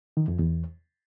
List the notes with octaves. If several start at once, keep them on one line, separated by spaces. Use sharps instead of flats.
D#3
F2
E2